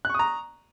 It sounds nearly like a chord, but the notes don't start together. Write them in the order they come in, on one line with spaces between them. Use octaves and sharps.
F#6 C#6 D#6 A#5